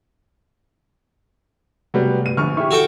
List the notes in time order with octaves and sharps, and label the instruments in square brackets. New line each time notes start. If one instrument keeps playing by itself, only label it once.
[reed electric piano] C3 A3 [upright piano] F#3 G3 B3
[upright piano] D#7
[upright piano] A#1 C#6 F6 [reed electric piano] D3
[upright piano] E4 G4 [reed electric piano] C#6
[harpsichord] F#4 A4 G5